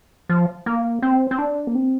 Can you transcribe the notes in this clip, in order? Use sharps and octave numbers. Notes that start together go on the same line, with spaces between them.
F3
A#3
C4
C4
D4
A#3
C4